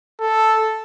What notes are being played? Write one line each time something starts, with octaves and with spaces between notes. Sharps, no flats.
A4